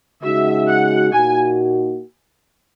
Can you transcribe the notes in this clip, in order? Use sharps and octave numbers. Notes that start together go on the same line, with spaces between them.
C#3 G#3 D#4 F#4 E5
F#5
A#2 A#3 D#4 F#4 G#5